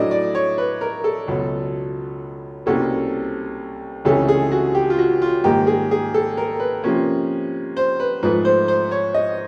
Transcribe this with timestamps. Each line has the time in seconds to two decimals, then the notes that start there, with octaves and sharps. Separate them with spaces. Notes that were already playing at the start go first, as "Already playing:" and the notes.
Already playing: A2 F#3 A3 D4 D#5
0.11 D5
0.35 C#5
0.58 B4
0.81 A#4
1.04 A4
1.28 C#2 B2 F#3
2.66 C2 B2 G3 A#3 C#4 A4
4.05 C#2 C3 E3 A3 C#4 A4
4.28 G#4
4.52 F#4
4.75 G4
4.90 F4
4.99 F#4
5.22 F4
5.44 G#2 D#3 G3 A#3 G4
5.67 G#4
5.91 G#4
6.14 A4
6.37 A#4
6.60 B4
6.84 C3 F3 A#3 C#4
7.77 C5
8.00 B4
8.23 G#2 F3 A3 B4
8.45 C5
8.68 C5
8.91 C#5
9.14 D#5